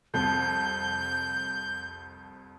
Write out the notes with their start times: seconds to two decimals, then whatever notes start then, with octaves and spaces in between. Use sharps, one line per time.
0.14 C2 F2 G6